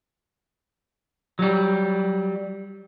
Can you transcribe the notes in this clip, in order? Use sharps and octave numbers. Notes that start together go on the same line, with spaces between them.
F#3 G3